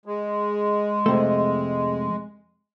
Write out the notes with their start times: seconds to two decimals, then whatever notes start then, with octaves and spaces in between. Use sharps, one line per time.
0.06 G#3
1.06 F2 C3 A3